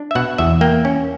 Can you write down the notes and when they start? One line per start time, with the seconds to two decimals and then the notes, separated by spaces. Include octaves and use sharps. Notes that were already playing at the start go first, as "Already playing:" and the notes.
Already playing: D4
0.11 E5
0.15 B2 F#5
0.38 E2 E5
0.61 A#3 G5
0.85 C#4